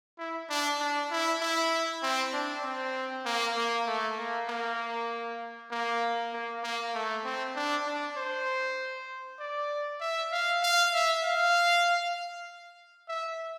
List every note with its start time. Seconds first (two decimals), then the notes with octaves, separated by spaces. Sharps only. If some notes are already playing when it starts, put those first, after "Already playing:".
0.19 E4
0.49 D4
0.80 D4
1.11 E4
1.41 E4
2.03 C4
2.33 D4
2.64 C4
3.25 A#3
3.57 A#3
3.87 A3
4.18 A#3
4.49 A#3
5.71 A#3
6.33 A#3
6.63 A#3
6.94 A3
7.25 C4
7.56 D4
7.87 D4
8.17 C5
9.40 D5
10.01 E5
10.32 F5
10.63 F5
10.94 E5
11.24 F5
13.08 E5